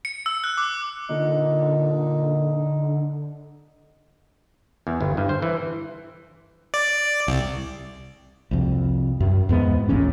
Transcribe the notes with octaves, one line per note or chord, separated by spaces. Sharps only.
C#7
E6
F#6
D6
A#2 D3 D#4
E2
G1
G2
C5
E3
D5
C2
C2 F2
F#2
E2 G#2 B3
D#1 A1 A#2 C#4